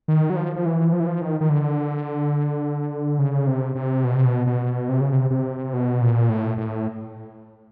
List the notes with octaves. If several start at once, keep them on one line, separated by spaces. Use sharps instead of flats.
D#3
F#3
F3
F3
E3
F3
E3
F3
D#3
D#3
D3
C#3
C3
C3
B2
C3
B2
B2
C3
C#3
C3
C3
B2
A#2
A2
A2